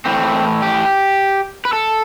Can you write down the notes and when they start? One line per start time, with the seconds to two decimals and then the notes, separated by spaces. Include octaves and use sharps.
0.05 A2 E3 C4
0.62 G4
1.65 B4
1.73 A4